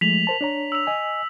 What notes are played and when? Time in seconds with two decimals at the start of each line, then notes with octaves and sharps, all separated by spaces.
0.01 F3 G#3 A3 B6 F7 F#7
0.27 A#4 C5 A5
0.41 D4 C#5 A#5
0.72 E6 F7
0.87 D#5 G#5